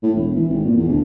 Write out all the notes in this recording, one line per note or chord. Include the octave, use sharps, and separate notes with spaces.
A2
E1
E3
G#1
A#2
E2
D2